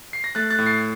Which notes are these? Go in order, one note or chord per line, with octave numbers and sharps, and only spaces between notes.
C7
A#6
A3 F#6 A6
F#6 A6
A2
A6 C7